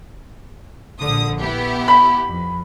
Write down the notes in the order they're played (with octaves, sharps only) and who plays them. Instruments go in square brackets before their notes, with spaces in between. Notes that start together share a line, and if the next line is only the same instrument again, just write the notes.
[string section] A#1 D3 D#6
B3 E4 G4
[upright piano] B5
[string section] F2